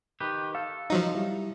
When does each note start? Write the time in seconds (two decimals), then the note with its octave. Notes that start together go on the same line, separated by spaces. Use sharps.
0.20 D#3 G4 B4
0.55 A4 F5
0.90 F3 F#3 D#4
1.15 G3 E4